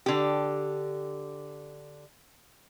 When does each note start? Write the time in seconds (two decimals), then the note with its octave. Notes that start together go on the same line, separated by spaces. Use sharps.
0.06 D3 G4